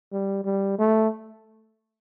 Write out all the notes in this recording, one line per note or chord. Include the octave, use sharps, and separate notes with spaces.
G3
G3
A3